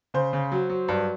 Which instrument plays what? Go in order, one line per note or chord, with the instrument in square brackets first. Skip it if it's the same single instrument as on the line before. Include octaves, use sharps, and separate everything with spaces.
[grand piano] C#3 C5
C#3
F#3
F#3
G2